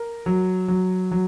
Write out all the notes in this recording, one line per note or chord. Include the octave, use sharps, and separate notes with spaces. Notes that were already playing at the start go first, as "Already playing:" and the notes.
Already playing: A#4
F#3
F#3
F#3